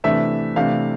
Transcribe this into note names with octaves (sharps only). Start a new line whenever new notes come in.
C3 E3 A3 D4 E5
C3 E3 A3 D4 F5